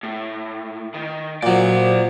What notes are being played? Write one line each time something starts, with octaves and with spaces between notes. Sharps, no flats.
A2
D#3
A#2 F#3 C5 D5